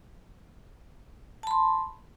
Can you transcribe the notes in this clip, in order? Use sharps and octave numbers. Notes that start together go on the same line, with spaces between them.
A5 B5 C6